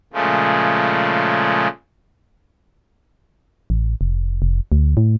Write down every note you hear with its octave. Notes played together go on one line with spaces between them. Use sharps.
A#2 C#3 F3 G#3 A3
A1
F1
F1
D2
A2